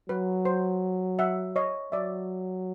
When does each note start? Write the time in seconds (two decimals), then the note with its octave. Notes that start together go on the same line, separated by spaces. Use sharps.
0.09 F#3 B4
0.45 C5
1.19 E5 F#5
1.56 C#5 D#5
1.92 F#3 D5 E5